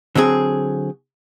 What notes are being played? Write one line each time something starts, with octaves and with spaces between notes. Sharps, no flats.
D3 F#3 C4 G#4